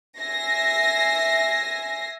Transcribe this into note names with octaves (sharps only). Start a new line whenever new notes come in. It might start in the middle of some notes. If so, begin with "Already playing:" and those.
E5 G#5 A#6 C7